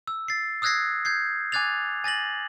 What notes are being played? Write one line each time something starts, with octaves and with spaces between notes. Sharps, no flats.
E6
A6 C7
D#6 E6 F#6 G#6 A#6 C7
G6 G#6 C7
G#5 D6 F#6 G#6 A6 F7
G#5 A6 A#6 F#7